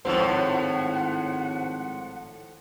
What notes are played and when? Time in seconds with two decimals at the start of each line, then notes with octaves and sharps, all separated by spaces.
0.05 G#1 A2 F3 C5 C#5 F#5 E6